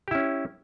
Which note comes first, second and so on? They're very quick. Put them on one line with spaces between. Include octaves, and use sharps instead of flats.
G4 E4 C#4